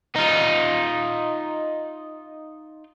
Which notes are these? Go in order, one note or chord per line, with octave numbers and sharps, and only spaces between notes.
D#4 F4